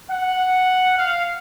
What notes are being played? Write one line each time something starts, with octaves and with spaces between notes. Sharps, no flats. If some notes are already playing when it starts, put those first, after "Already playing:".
F#5
F5